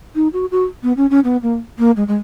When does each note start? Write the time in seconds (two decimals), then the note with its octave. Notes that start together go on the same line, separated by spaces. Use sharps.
0.15 D#4
0.33 F#4
0.51 F#4
0.83 B3
0.97 C#4
1.10 C#4
1.24 B3
1.42 A#3
1.78 A#3
1.96 G#3
2.08 G#3